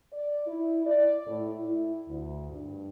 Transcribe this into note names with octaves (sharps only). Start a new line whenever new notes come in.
D5
E4
D5
A2
E4
D2
G2